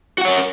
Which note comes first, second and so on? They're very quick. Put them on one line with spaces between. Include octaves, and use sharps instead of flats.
F#4 F#5 C#5 A#4